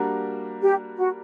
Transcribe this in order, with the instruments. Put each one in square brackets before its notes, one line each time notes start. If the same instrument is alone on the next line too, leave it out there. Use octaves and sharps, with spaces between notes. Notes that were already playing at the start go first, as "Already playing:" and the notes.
Already playing: [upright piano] G3 A#3 D4 F#4 A#4
[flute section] G4
F#4